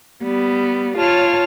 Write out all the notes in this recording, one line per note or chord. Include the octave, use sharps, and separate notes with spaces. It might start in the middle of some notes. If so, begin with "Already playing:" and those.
G3 B3
F4 C#5 A5 F6